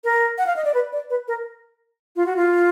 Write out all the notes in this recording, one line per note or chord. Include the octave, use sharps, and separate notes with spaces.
A#4
F#5
F5
D#5
D5
B4
D5
B4
A#4
F4
F#4
F4